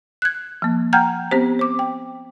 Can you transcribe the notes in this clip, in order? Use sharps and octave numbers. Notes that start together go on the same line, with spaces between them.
F#6 G#6
F3 A#3
F#5 G5 A#5 F6 G6 G#6
B3 C4 G4 C5
C5 D6
G5